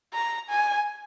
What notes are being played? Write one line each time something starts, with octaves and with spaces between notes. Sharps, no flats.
A#5
G#5